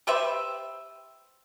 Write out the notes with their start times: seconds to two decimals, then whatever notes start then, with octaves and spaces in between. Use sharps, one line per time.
0.07 G4 B4 C5 E5